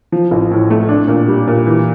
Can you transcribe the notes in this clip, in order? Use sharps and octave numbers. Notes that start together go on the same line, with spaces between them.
F3
A1
A2
A3
D4
A#2
G3
A#2
E3